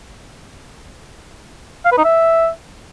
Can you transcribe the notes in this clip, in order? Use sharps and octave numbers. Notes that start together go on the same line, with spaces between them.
F5
B4
D#4
E5